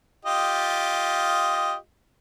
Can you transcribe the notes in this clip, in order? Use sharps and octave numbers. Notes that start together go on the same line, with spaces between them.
F4 G4 D#5